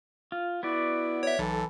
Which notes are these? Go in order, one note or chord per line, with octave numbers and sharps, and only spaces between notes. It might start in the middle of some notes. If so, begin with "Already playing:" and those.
F4
B3 E4 F#4 D5
C#5 E5
B1 E3 A4